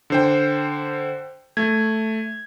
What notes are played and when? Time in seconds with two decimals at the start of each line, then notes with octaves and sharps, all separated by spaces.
0.10 D3 C5 G5
1.57 A3 G#6